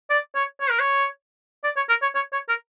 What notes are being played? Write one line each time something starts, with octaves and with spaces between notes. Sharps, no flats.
D5
C#5
C#5
A#4
C#5
D5
C#5
A#4
C#5
C#5
C#5
A#4